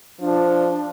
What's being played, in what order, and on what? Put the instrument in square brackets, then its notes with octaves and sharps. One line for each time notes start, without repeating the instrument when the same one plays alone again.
[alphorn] F3 [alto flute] D4